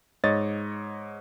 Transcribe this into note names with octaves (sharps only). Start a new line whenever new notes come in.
G#2 C#5 D#5 A6